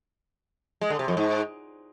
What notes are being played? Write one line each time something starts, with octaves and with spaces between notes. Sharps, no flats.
G#3
D3
C3
F2
G#2